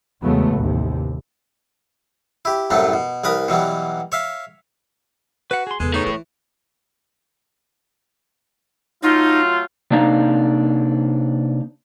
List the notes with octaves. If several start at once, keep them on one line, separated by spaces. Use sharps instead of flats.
E2 C#3 F#3 G#3 A3 B3
A1 D#2 C3
E4 G4
C2 F#2 A2 F#3 G3 A3
B2
C2 A#4 B4 D#6
B2 E3 F#3 G3
C#5 E5 F5
F#4 B4 F#5
G#4 C6
E2 C#3 G#3 G#4 A4 B4
A3 D#4 C#5
E3 E4
F#3 A3 D#4 F4
C3 A#3 D4 D#4 F5 A#5